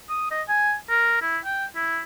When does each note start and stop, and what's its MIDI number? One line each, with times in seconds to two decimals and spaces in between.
0.09 0.28 87
0.31 0.42 75
0.49 0.75 80
0.89 1.17 70
1.22 1.38 64
1.44 1.65 79
1.76 2.02 64